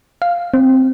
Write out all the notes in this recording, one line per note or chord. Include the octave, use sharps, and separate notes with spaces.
F5
C4